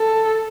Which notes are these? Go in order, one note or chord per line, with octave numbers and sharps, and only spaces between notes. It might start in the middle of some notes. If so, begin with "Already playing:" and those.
Already playing: A4